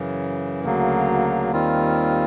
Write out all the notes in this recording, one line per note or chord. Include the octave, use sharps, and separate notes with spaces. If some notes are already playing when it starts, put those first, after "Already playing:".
Already playing: F#2 C#3 E3
D2 C#3 F#3 A#3
D#2 D#3 G3 C4 F4